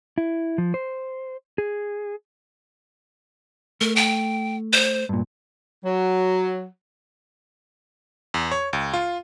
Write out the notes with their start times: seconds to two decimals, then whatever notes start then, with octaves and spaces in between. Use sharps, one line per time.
0.18 E4
0.58 F3
0.74 C5
1.58 G#4
3.81 A3 A#4
3.96 G5
4.73 C5
5.09 G2 A#2
5.84 F#3
8.34 E2
8.52 C#5
8.73 C#2
8.94 F4